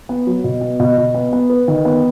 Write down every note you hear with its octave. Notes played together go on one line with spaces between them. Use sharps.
B3
F#3
B2
B3
B2
B2
B3
B3
B4
D#3
B3